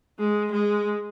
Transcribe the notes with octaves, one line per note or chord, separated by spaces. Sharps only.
G#3
G#3